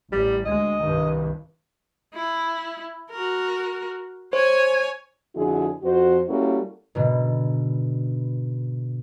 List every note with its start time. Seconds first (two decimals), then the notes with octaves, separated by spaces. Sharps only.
0.12 A1 G3
0.46 D2 G#3 D#5
0.83 C2 G2 D#3
2.14 E4
3.10 F#4 A#4
4.33 C5 C#5 G#5
5.35 F2 D3 E4 F#4 G#4
5.83 F2 F#4 C5
6.28 G3 A#3 C#4 E4 F#4 A4
6.95 G#2 B2 D3